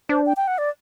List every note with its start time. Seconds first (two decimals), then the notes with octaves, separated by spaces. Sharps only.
0.09 D4 C5
0.26 G5
0.37 G5
0.48 F#5
0.58 D5